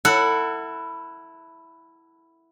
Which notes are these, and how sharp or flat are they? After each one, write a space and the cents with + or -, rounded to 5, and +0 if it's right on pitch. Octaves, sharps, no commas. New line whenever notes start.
E4 +0 A4 +35 F#5 +0